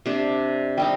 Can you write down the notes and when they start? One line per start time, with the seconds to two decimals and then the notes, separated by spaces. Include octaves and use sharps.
0.06 C3 D4
0.78 G3 C4 D#4 G5